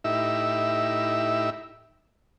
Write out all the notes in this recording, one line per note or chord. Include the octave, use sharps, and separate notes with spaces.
A2 D#4 E4 G4 E5 E6